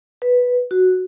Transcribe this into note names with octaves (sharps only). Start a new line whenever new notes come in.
B4
F#4